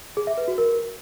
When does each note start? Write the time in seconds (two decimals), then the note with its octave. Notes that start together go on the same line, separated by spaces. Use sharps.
0.17 G#4
0.27 E5
0.37 B4
0.48 F#4
0.58 A#4